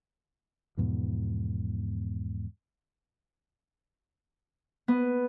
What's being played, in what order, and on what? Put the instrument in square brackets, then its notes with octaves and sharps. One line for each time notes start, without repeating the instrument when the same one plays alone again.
[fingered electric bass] E2 G#2 B2 F3
[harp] B3